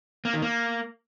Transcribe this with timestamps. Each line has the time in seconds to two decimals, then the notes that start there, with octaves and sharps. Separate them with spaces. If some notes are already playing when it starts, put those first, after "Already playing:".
0.25 A#3
0.34 D#3
0.42 A#3